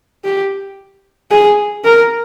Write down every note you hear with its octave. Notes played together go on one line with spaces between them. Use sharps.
G4
G#4
A#4